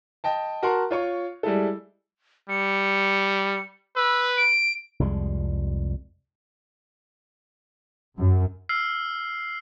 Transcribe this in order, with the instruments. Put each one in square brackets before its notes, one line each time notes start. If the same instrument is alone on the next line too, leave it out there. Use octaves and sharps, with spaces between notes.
[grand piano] D#5 G5 A5
F#4 A#4 F#5 A5 C6
F4 C#5 C#6
G3 G#3 E4 A4
[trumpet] G3 [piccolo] C#7
[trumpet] B4 [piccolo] E6
[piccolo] D7
[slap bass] C2 F2 G3 G#3
[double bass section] F#2
[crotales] E6 F6 C7